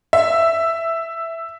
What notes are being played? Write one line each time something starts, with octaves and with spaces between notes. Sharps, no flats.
E5